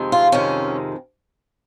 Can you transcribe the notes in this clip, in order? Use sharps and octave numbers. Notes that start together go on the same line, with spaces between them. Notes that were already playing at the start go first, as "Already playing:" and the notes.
Already playing: F2 C3 D#3 G#3
F4
F2 C3 D#3 G#3 C#4